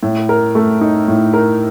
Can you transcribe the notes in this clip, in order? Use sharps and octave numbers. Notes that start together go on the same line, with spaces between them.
A2
A#4
A3
D#4
A2
A#4